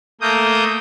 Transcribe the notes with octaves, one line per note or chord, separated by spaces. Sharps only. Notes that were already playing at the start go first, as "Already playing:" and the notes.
A3 A#3 D#6 G6